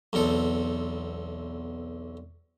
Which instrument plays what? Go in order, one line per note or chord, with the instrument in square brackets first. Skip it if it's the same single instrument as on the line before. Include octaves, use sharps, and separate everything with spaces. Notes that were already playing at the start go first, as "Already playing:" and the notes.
[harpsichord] B1 E2 C4 A4